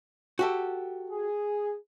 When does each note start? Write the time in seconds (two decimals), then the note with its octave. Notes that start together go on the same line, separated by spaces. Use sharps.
0.39 F#4 G4 A4
1.11 G#4